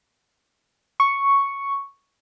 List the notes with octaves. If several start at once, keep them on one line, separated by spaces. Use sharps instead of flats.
C#6